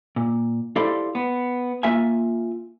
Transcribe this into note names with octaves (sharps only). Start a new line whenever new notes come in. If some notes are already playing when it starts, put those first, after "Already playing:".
A#2
E4 G4 A4 C5 D5 F5
B3
A#3 F4 E5 F5 G#5